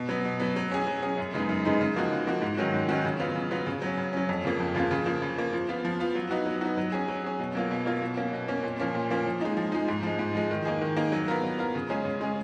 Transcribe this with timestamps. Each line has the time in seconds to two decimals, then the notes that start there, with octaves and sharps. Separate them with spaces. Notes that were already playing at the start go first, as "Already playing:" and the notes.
Already playing: B2
0.09 F#3 B3
0.25 B2
0.40 F#3 B3
0.56 F#3
0.71 C#4 G#4
0.87 F#3
1.02 C#4 G#4
1.18 F#2
1.34 C#3 G#3 B3 D#4
1.49 F#2
1.65 C#3 G#3 B3 D#4
1.81 C#3
1.96 F3 A#3 D#4 F#4
2.12 C#3
2.27 F3 A#3 D#4 F#4
2.42 G#2
2.57 D#3 F#3 C#4 F#4
2.74 G#2
2.89 D#3 F#3 C#4 F#4
3.05 C#3
3.20 F#3 B3 F4
3.35 C#3
3.51 F#3 B3 F4
3.66 C#3
3.82 F#3 C#4
3.97 C#3
4.13 F#3 C#4
4.29 F2
4.45 C#3 F3 A#3 F4
4.60 F2
4.75 C#3 F3 A#3 F4
4.91 C#3
5.06 F3 A#3
5.22 C#3
5.38 F3 A#3
5.53 F3
5.69 B3 F4
5.85 F3
6.00 B3 F4
6.15 F#3
6.31 B3 D#4 F#4
6.46 F#3
6.61 B3 D#4 F#4
6.77 F#3
6.92 C#4 G#4
7.08 F#3
7.24 C#4 G#4
7.39 B2
7.55 F#3 A#3 F4
7.71 B2
7.86 F#3 A#3 F4
8.02 B2
8.17 A#3 C#4
8.33 B2
8.48 A#3 C#4
8.63 A#2
8.80 F3 A#3 C#4
8.95 A#2
9.10 F3 A#3 C#4
9.26 F3
9.41 G#3 D#4
9.57 F3
9.72 G#3 D#4
9.88 G#2
10.03 F3 G#3
10.19 G#2
10.35 F3 G#3
10.51 D#3
10.65 A#3 D#4 G#4
10.82 D#3
10.96 A#3 D#4 G#4
11.12 F#3
11.28 B3 F4 A#4
11.43 F#3
11.58 B3 F4 A#4
11.75 C#3
11.90 G#3 C#4 G#4
12.05 C#3
12.21 G#3 C#4 G#4